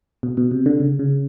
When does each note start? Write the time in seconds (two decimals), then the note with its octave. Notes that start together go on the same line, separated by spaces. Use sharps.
0.23 B2
0.37 B2
0.51 C3
0.66 D3
0.80 C#3
0.99 C#3